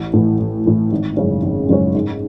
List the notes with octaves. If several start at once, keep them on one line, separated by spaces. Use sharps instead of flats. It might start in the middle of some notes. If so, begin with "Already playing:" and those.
Already playing: A1
A2 E3
A1
A2 E3
G#1
F#2 C#3 G#3 C#4
G#1
F#2 C#3 G#3 C#4
G#2